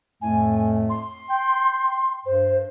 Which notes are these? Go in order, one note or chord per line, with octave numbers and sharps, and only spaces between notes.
F2 A2 A3 G#5
C6
G5
G2 C5